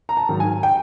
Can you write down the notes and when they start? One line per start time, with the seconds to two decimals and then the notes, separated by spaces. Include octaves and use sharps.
0.09 A#5
0.17 A5
0.29 G#2 D#3 F#3
0.40 G#5
0.63 G5